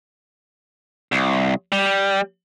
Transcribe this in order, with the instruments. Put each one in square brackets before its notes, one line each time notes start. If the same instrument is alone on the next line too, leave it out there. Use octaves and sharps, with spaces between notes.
[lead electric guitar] C2
G3